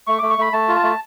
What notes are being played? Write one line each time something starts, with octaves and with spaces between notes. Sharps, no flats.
A3 C#6
A3 D6
C#6
A3 B5
A3 A5
F4
A5
A3